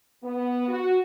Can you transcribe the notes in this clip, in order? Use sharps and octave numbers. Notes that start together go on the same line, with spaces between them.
B3
F#4